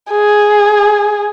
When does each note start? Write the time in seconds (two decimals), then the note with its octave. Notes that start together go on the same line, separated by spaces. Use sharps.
0.11 G#4